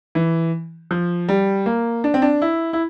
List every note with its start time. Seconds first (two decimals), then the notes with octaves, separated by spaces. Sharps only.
0.15 E3
0.91 F3
1.28 G3
1.66 A#3
2.04 D4
2.14 C4
2.22 D4
2.42 E4
2.73 E4